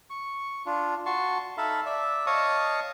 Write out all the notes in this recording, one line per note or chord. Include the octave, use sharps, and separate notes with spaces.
C#6
D4 F4
F#4 A5 C6 C#6
D#4 A4 E5 F5 A5 B5
D5 E5
C#5 D#5 F5 A5 C#6 D#6